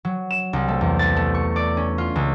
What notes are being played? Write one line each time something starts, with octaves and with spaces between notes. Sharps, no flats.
F#3
E7
C2
A3
E2
A6
A3
C#6
D5
C#4
F4
C#2